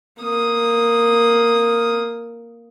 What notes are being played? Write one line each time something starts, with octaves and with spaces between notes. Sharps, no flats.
A#3 D#6